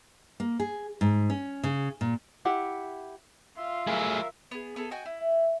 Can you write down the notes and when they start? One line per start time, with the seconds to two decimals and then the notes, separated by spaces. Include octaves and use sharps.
0.40 A#3
0.60 G#4
1.01 G#2
1.30 C#4
1.63 C#3
2.01 A#2
2.45 E4 G4 E5 F#5
3.57 F4 E5 C6
3.87 F#3 A3 E4 G#4 A#4 E5 F5
4.51 B3 G#4
4.76 B3 G#4 A4
4.91 F#4 D#5 G5 G#5
5.06 E4